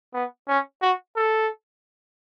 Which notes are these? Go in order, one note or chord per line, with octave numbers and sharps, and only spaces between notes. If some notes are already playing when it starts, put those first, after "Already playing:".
B3
C#4
F#4
A4